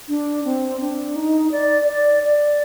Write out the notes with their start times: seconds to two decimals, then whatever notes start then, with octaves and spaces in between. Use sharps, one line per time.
0.08 D4
0.45 C4
0.80 D4
1.16 D#4
1.52 D5
1.88 D5
2.23 D5